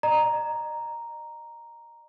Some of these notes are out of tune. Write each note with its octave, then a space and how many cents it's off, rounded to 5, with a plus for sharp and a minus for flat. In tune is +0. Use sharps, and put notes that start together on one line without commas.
D#5 -45 A#5 +0